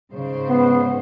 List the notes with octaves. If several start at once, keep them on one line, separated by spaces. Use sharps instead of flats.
G#2 C#3 C5
B3